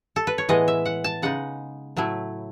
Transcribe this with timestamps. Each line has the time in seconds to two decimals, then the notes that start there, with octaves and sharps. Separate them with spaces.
0.16 A4
0.27 B4
0.38 C#5
0.49 A2 E3 G#3 B3 D#5
0.68 E5
0.85 F#5
1.04 A5
1.22 C#3 G#3 D#4 F#5
1.97 A2 F#3 A3 E4